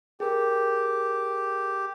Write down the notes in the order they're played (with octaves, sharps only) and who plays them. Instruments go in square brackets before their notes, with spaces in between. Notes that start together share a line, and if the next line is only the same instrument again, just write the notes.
[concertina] G4 [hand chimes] G#4 A#4